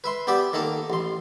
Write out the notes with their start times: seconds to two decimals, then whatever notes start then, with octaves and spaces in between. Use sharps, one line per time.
0.04 B4 E5 C6
0.27 B3 G4 D5 E5
0.53 D#3 A#3 A4 A5
0.90 A1 C6